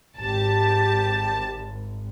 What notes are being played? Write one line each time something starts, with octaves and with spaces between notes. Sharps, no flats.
G#1 G4 A5